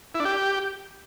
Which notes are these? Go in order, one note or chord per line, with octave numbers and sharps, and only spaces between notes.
E4
D4
G4